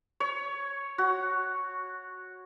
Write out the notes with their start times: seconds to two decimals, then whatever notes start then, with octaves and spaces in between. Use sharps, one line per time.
0.20 C#5
0.98 F#4